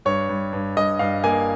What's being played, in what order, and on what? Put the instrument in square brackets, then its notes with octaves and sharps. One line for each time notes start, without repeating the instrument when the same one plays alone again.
[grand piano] G2 C#5
G2
G2
G2 D#5
G2 F5
A#3 G#5